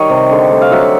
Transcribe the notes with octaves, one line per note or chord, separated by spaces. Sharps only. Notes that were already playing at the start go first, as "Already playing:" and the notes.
Already playing: D#3 G3 C#5 D#5
C3
D3
A3
F5
F#3 E5 F#5